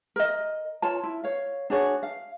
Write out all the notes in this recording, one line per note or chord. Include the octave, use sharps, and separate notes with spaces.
A#4 D#5
F4 C#5 A5
E4
C#5 F5
D4 F#4 G#4 C#5
F5